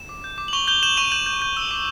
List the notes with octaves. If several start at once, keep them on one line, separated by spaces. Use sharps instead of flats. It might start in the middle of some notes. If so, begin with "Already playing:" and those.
Already playing: E7
D6
G6
D6
F#7
C#6 F7 G7
G6 F7 G7
G6 E7 F#7
C#6 D#7 F7
G6 E7 F#7
G6
G6
E6
D6